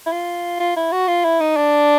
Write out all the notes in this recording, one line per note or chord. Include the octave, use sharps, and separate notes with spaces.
E4
F4
F4
E4
F#4
F4
E4
D#4
D4